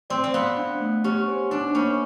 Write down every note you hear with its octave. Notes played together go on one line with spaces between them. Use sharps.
C4 D5
C4
B3 F5
D4
A3
C#4 G4
C5
D4 D#4
A#3 C#4